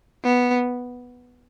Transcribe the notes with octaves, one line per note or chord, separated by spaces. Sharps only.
B3